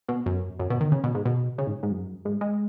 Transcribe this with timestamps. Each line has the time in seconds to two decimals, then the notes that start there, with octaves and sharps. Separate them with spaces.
0.08 B2
0.26 F#2
0.59 F#2
0.70 B2
0.81 D#3
0.92 C#3
1.04 B2
1.15 G#2
1.25 B2
1.58 C#3
1.67 G#2
1.83 G#2
1.91 F#2
2.25 G#2
2.41 G#3